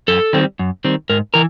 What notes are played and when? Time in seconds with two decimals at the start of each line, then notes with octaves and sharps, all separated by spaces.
0.08 F#2 A4
0.33 D#3 G3 C4
0.59 F#2
0.85 D#3 G3 C4
1.10 G#2 A#4
1.34 E3 A#4